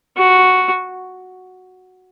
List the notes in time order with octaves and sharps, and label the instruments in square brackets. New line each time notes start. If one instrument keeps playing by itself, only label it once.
[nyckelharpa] F#4